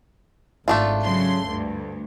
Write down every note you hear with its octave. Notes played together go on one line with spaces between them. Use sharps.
G#1 A3 D4 F4
C#3 F#3 C6
D2 G2